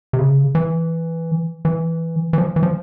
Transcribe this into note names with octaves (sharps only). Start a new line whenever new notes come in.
C3
C#3
E3
E3
E3
F3
E3
F3